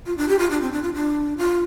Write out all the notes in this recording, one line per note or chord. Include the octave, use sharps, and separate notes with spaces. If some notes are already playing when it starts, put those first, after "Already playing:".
F4
D4
G4
F4
D4
C4
D4
F4
D4
F4